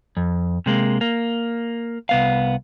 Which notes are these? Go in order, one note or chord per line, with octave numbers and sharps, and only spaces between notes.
F2
C3 G#3 A#3
A#3
C2 B3 F5